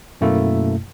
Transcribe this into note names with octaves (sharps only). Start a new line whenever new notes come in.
F#2 B2 A3 A#3 E4